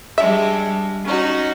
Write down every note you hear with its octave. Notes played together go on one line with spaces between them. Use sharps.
G3 G#3 D4 E5
C#4 D#4 F#4